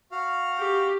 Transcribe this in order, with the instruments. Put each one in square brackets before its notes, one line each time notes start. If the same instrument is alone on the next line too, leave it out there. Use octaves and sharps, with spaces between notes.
[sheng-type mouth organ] F#4 F5
[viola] G4